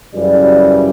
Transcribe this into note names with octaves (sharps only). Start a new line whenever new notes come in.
F#2 C#3 E3 G3